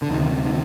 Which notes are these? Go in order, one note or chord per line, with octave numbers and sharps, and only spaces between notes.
D3
D2 C3 D#3
D#3